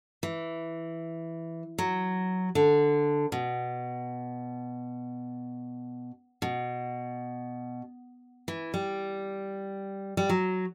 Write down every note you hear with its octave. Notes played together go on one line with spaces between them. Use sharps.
E3
F#3
D3
B2
B2
E3
G3
G3
F#3